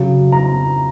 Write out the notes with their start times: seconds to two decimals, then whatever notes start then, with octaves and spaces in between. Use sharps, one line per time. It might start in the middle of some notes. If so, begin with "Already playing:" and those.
Already playing: C#3 F#3
0.32 A#5